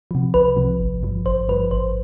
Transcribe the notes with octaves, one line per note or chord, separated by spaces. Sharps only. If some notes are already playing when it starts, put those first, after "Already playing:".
C3 F3
C2 B4
C3 F3
G#1
G2 F3
G#1 C5
G2 F3 B4
G#1 C5